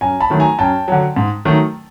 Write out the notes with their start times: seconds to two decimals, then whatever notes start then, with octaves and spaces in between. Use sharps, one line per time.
0.01 F#2 G#5 A#5
0.20 A5 B5
0.30 D#3 F#3 A3
0.40 G#5 A#5
0.59 F#2 G5 A5
0.88 D3 F#3
1.16 G#2
1.45 D#3 F#3 A3